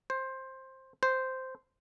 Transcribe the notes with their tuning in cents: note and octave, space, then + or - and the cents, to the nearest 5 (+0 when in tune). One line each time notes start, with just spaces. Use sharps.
C5 +15
C5 -5